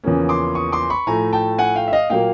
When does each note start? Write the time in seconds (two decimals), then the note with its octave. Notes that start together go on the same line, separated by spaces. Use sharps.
0.04 E2 C#3 F3 A#3 C#4
0.29 C6 D6
0.55 C#6 D#6
0.72 C6 D6
0.90 B5 C#6
1.07 A2 F3 A3 G#5 A#5
1.33 G5 A5
1.58 F#5 G#5
1.76 F5 G5
1.88 E5
1.93 D#5 F5
2.10 A#2 F#3 A#3 F5 G5